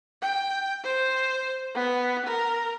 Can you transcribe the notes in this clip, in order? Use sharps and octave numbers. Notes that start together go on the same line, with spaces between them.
G5
C5
B3
A#4